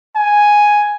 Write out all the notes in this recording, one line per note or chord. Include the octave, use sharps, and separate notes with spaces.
G#5